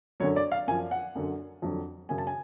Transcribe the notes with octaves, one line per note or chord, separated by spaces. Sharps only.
F#2 D3 F#3 C#5
D5
F5
F#2 F3 G#5
F#5
F#2 D3 F#3
F2 D3 F#3
F#2 C#3 F#3 G#5
A5
G#5